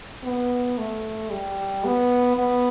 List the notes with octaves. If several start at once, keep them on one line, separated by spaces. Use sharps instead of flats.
B3
A3
G3
B3
B3